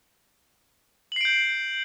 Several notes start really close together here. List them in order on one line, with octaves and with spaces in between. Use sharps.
F#7 C7 D7 G6